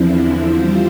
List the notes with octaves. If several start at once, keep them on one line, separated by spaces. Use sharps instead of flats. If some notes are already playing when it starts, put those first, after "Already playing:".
Already playing: E2 D3 F3 C4 E4
G3 C4 F4 C5